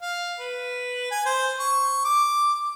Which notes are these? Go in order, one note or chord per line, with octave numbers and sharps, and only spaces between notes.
F5
B4
G#5
C5
C#6
D6